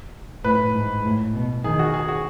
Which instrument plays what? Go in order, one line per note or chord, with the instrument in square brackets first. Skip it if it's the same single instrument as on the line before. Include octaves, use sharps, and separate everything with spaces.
[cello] A2 [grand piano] B4
[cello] G#2
A2
B2
[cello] D#3 [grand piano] G#4
[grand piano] F#4
G#4
F#4